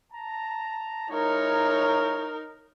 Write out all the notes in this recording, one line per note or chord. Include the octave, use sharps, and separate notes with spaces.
A5 A#5
G#3 D#4 E4 A#4 C#5